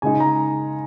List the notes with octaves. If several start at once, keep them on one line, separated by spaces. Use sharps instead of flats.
C#3 G#3 D#4 G#5
A#5